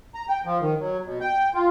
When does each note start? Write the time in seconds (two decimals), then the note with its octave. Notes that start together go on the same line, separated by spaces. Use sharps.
0.14 A#5
0.29 G5
0.45 F3
0.61 D#3
0.80 F#3
1.06 B2
1.21 G5
1.54 F4